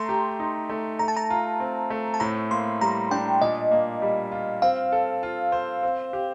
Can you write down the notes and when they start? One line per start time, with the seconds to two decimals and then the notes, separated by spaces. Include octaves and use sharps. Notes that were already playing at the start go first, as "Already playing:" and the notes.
Already playing: A3 A#5 C6
0.09 G4
0.40 D#4
0.70 A3
0.99 A3 A#5
1.08 A5
1.17 A#5
1.30 F4
1.60 C4
1.90 A3
2.14 A5
2.20 A2 A#5
2.51 A#3 C6
2.81 G3 A#5
3.11 D4 G5
3.41 A#2 D#5
3.71 A#3
4.02 G3
4.32 F4
4.62 C4 F5
4.92 A4
5.23 F4
5.52 C5
5.83 C4
6.13 G4